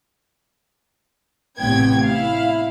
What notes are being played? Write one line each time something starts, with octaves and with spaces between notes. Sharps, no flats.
A1 A2 C3 B3 G5 G#6
E4 F5